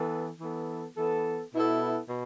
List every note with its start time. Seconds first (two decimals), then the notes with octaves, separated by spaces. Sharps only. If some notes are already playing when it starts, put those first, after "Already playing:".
Already playing: E3 B3 A4
0.40 E3 B3 A4
0.97 E3 B3 A4
1.53 B2 B3 E4 A4
2.09 B2